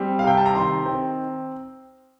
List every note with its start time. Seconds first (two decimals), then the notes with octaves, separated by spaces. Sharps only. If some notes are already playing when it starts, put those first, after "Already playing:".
Already playing: G3 C4
0.19 F5
0.24 C3 G5
0.37 A5
0.46 A#5
0.55 D#3 C6
0.86 C4